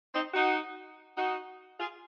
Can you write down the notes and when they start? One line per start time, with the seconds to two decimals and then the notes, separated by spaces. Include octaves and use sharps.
0.13 C4 D#4
0.33 D#4 F#4
1.16 D#4 F#4
1.78 F4 G#4